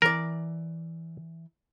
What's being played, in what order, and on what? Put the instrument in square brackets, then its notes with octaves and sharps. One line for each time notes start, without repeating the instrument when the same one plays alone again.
[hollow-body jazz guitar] E3 D5 [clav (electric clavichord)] A#4